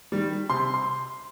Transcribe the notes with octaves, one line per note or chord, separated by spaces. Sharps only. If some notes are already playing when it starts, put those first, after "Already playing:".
D#3 G3
C3 C6
C6